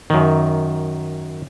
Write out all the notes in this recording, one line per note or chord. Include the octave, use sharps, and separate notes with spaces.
F#2 D#3